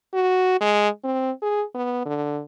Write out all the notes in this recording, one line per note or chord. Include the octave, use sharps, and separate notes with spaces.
F#4
G#3
C4
G#4
B3
D3